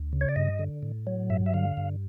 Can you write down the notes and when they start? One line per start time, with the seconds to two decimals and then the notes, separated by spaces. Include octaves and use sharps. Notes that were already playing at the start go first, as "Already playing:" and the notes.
Already playing: D2
0.13 C#3
0.21 C#5
0.29 D5
0.36 G2 D#5
0.59 D3
0.83 A2
1.07 F#3
1.30 G2 E5
1.46 E5
1.54 D3 F5
1.77 G2